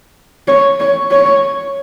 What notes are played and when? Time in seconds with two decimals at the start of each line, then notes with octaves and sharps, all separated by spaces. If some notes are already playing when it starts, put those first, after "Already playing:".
0.48 C#5
0.80 C#5
1.11 C#5